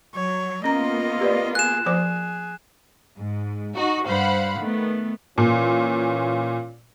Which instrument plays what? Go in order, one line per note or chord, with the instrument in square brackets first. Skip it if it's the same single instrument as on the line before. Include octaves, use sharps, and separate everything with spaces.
[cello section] F#3 [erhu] C#5
[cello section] A#3 B3 F4 [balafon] C#4 A#5 [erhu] D#5
[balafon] G4 B4 D5
[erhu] G#4 [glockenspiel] F#6 E7
[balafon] F3 C5 D6 [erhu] G#4
[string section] G#2
D#4 F#4
G2 C5 F5 F#5 B5
D#3 A3 B3
[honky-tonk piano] A#2 [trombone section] E3 C#4 F4